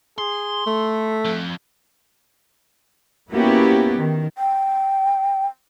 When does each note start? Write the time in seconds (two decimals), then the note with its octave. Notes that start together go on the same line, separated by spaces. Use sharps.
0.18 G#4 C6
0.67 A3 A4
1.25 F2
3.32 A#3 B3 C#4 E4 F#4 G4
3.96 D#3
4.38 G5